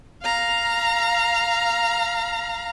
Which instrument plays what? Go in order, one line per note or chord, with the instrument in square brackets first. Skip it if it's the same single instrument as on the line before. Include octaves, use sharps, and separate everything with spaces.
[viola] F5 A#5